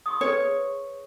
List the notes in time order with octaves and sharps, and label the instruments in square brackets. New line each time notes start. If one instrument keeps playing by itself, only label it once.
[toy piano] C6 C#6 D#6
[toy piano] G#4 B4 [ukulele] C#5